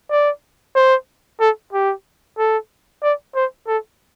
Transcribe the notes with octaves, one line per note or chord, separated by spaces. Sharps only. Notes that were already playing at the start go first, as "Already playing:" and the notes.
D5
C5
A4
G4
A4
D5
C5
A4